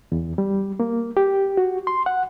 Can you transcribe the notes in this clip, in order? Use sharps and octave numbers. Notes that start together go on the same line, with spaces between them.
E2
G3
A#3
G4
F#4
C6
F#5